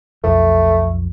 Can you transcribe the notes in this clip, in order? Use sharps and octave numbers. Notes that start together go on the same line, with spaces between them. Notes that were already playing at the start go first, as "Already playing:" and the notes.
B1 F2 A3